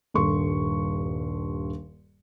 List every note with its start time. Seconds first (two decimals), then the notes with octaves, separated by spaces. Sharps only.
0.14 D#1 G2 A4 C6 C#6